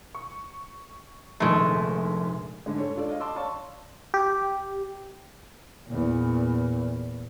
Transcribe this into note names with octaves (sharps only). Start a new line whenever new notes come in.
C#6
F1 A#1 D#2 G#3 A3
G#2 D3 G#3
A4 C#5
D4 F4 A4 D5
D#5 F5
D#5 A5 C6 D6 E6
C#5 D5 F5 A5 C6 C#6
G4
E2 A#2